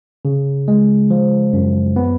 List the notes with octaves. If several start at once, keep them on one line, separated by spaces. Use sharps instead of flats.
C#3
G#3
F3
F#2
B3